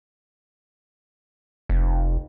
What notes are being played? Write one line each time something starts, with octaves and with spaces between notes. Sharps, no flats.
F1